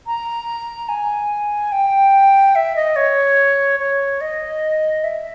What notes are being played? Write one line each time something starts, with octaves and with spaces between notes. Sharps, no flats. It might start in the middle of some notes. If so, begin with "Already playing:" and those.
A#5
G#5
G5
E5
D#5
C#5
C#5
D#5
E5